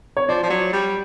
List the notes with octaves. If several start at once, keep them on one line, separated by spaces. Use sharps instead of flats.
C#5
F3 D5
F3
F#3
G3